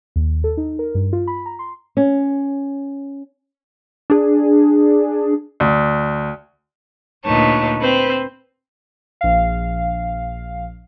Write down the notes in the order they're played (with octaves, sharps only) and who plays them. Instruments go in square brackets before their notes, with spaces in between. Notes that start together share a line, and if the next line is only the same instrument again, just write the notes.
[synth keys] D#2
A4
D#4
A#4
G2
F4
B5
A#5
C6
[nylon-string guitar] C#4
[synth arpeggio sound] D4 G#4
[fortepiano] D2
[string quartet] D2 A#2 D#4 B4 C#5 A5
C4 B4 C5
[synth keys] A#1 F5